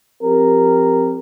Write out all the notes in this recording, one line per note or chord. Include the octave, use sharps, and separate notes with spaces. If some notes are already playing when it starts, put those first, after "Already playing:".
F3 C4 G4 A#4